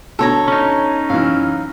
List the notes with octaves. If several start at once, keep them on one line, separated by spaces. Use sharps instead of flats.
B2 D3 A4 C#5 A#5
C#4 D#4
F#2 E3 F5